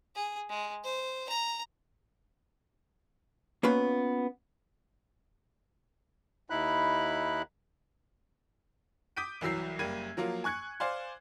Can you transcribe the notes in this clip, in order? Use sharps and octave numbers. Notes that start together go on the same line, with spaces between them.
G#4
G#3
C5
A#5
A#3 B3 C#4 F4 B4
D#2 D#4 E4 B5 F#6
D6 D#6 G6 B6 D7 D#7
C2 E3 F#3 E6 C7
F#1 G3 A#3 G#6 D#7
F3 F#3 A#3 F4
G#5 C#6 F#6 G#6 C#7
C5 D5 F5 G#5 C6